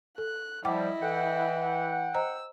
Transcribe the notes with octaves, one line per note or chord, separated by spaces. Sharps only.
A4 F#6
F3 G3 E4 D#5 F#5 G5 D6
E3 A4 F#5 G5
C5 D#5 A#5 E6